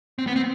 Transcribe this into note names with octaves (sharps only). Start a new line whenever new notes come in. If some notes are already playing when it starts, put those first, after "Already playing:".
C4
B3
C4